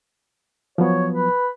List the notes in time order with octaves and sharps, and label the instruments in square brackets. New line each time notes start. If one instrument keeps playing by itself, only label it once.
[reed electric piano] F3 F#3 B3 [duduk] C#5
[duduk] B4